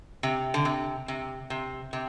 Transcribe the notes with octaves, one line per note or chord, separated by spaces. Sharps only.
C3
D3
C3
C3
C3
C3